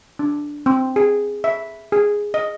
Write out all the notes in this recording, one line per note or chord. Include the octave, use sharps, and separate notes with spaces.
D4
C4
G#4
E5
G#4
D#5